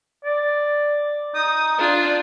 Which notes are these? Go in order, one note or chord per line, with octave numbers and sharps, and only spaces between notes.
D5
D#4 D#6
D4 F4